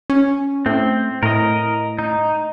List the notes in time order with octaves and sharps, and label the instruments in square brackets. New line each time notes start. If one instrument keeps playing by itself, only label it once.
[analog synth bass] C#4
[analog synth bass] A2 [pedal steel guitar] C4
[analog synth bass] A2 [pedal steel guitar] A#4 D#5
[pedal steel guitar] D#4